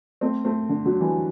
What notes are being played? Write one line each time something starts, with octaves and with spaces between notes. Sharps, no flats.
A3 C4
A3 C4
D3
D3 F#3
E3 G3